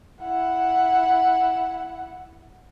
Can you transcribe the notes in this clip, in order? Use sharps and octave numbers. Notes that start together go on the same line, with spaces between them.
E4 F#5